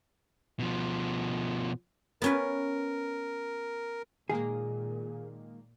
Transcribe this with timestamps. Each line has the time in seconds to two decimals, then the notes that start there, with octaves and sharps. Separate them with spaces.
0.59 B2 F3
2.22 B3 C#4 A#4 B4
4.30 A#2 D#3 G#3 A#3 G#4